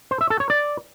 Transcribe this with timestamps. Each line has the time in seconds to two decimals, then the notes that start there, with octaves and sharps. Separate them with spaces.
0.11 C5
0.21 E5
0.30 A4
0.40 C#5
0.50 D5